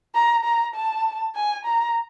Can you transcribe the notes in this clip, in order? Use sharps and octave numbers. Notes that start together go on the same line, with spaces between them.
A#5
A#5
A5
G#5
A#5